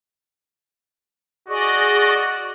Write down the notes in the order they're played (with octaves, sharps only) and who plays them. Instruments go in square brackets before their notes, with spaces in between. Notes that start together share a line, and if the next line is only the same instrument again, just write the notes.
[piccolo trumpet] F#4 [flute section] G#4 C#6 [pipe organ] D5 D#5